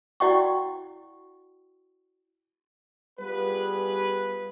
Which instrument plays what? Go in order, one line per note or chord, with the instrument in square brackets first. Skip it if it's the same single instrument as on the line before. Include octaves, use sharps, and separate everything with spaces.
[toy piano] E4 F#4 D5 F#5 G5 C#6
[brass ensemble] G3 B3 F4 G#4 B4